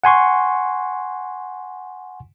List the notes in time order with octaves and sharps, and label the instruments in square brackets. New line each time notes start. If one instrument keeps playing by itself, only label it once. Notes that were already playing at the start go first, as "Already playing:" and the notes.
[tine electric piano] F#5 G#5 C6 C#6